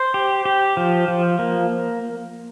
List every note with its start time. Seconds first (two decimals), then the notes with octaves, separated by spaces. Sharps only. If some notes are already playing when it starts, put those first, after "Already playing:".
Already playing: C5
0.14 G4
0.45 G4
0.77 F3
1.08 F3
1.39 A#3